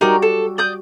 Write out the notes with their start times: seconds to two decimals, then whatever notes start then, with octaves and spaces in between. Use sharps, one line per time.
0.01 G3 D#4 F#4 G4 A#4 D5
0.22 A4
0.58 D5 D#6 G6